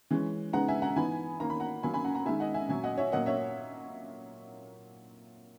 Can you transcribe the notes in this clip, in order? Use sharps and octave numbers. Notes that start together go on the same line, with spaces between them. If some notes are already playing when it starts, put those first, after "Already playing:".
E3 G#3 C#4
C#3 G#3 B3 D#4 F#5 A#5
E5 G#5
F#5 A#5
E3 B3 D#4 G#5 B5
D#3 A#3 C#4 A#5
B5
F#5 A#5
D#3 F#3 A#3 D#4 G#5 B5
G#5 B5
F#5 A#5
F#5 A#5
D#3 G#3 D#4 E5 G#5
D#5 F#5
E5 G#5
A#2 F#3 C#4 E5 G#5
D#5 F#5
C#5 E5
A#2 F#3 A#3 D#5 F#5
C#5 E5